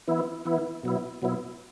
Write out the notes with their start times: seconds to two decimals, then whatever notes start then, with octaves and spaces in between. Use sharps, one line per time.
0.08 E3 B3 E4
0.45 E3 B3 E4
0.83 B2 F#3 B3 E4
1.22 B2 F#3 B3 E4